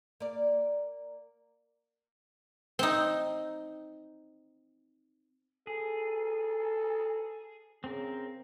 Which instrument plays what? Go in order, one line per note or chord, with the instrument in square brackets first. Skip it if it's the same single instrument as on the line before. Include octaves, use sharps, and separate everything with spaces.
[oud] A#3 D5
[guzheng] C4 D#4
[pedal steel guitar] G#4 [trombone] A4
[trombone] C#3 [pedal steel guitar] C4 A#4